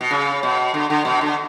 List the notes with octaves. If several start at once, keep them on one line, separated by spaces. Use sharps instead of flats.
B2
C#3
B2
D3
D3
B2
D3